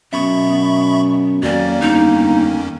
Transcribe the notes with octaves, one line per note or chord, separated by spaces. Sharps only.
F#2 B2 B3 E5 B5 C#6
F2 D#3 F#3 A#3 C#4 D5
G1 D#4